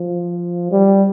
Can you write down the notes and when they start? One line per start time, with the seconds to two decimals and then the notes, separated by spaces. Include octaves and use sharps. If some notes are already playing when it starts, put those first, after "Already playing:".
Already playing: F3
0.71 G3